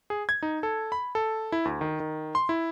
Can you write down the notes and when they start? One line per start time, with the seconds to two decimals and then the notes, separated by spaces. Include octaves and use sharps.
0.10 G#4
0.29 G#6
0.42 D#4
0.63 A4
0.92 B5
1.15 A4
1.52 E4
1.65 D2
1.81 D#3
2.00 D#3
2.35 C6
2.49 E4